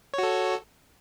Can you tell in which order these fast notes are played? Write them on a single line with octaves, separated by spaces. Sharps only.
C#5 F#4 A4